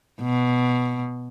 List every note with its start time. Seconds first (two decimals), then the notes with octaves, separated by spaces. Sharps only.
0.21 B2